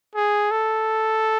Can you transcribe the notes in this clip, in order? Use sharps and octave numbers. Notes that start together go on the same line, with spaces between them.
G#4
A4